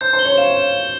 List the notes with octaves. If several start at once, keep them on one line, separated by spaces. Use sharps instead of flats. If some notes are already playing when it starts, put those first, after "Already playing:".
C5 G6
C5
G7
C#5
F5 E7